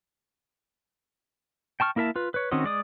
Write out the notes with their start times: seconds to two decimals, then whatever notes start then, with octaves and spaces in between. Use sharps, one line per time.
1.80 G5 A5 C#6 F6
1.96 A#3 E4 A#4 E5 A5
2.16 F4 B4
2.34 B4 C#5
2.51 D#3 C4 C#4 F#4 D#5
2.64 G#3 D5 D#6